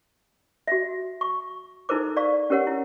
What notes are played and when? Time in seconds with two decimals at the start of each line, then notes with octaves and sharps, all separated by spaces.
0.67 F#4 E5
1.21 C#6
1.89 D#4 E4 A4 A#4 C5 D6
2.16 D5 F5 C#6
2.50 C#4 G4 A#4 C#5 F#5
2.67 E4